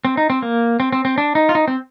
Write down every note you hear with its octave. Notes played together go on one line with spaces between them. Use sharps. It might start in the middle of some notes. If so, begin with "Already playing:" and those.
C4
D#4
C4
A#3
C4
C4
C4
D4
D#4
F4
D#4
C4